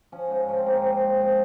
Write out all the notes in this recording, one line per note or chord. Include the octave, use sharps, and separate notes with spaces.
F3 C#4
G#2
F3 C#4
C4
G#2 A#3
C4
F3
G#2
F3